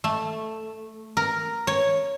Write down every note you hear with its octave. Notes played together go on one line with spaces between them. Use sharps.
A3
A#4
C#5